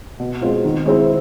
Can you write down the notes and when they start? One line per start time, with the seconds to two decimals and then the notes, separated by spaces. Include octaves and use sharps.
0.20 B2
0.41 G#3 C4 F4
0.64 D#3
0.86 G#3 C4 E4